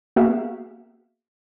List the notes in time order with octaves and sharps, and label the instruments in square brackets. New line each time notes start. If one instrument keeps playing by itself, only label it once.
[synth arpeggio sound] A#3 B3 F#4 G#4 E5 F5